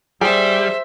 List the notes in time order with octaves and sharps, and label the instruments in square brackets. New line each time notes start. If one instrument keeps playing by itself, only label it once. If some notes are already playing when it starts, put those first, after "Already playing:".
[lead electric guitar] G3 [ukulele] G#4 [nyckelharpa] C5 E5